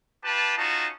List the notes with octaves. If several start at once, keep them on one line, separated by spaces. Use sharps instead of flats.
F4 G4 B4 A5
C#4 D#4 F4 F#4 A5